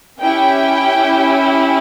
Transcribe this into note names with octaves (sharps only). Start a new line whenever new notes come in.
C#4 E4 G4 G5